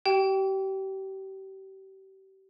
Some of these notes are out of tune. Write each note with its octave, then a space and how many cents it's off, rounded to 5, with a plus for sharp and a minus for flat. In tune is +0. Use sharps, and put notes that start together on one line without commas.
G4 -35 G5 -10